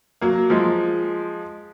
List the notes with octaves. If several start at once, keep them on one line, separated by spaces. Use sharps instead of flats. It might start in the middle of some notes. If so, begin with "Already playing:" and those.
F#3 A#3
F3 G#3